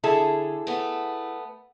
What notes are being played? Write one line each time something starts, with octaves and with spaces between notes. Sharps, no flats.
D3 E4 G#4 A4
A3 B3